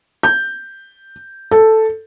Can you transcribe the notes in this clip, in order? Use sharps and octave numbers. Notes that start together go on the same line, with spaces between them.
G6
A4